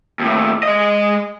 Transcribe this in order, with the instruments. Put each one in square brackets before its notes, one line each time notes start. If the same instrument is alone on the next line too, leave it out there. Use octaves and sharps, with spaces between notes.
[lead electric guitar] D#2 A2
G#3 D#5